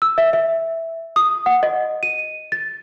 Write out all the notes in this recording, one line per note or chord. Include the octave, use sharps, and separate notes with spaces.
E6
E5
E5
D#6
F#5
D#5
D#7
A6